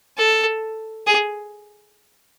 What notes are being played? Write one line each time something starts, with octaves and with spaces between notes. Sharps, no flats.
A4
G#4